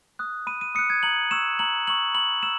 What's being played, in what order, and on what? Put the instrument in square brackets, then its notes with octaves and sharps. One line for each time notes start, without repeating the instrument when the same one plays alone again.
[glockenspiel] D#6 F#6
B5 D#7
D#7
D#6 F#6 C#7
G#6
A#5 F#7
C#6 E6 E7
A#5 F#7
C#6 E6 F#7
B5 F#7
E6 E7